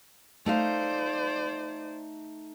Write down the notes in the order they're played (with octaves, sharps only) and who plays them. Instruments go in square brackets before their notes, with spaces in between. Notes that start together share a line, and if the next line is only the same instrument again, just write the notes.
[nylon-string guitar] A3 D#4 F5 [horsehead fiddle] C5 D5